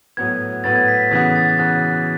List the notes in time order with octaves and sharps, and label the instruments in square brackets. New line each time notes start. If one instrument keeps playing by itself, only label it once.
[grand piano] A2 F#3 B3 F#4 B4 [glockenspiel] G#6
[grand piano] A2 F#3 B3 F#4 B4 [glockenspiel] A6
[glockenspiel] G#6
B6
B6
[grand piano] C#3 E3 B3 F#4 [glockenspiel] A6
[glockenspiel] B6
A6
F#6
[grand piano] C#3 E3 B3 F#4 [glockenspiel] F#6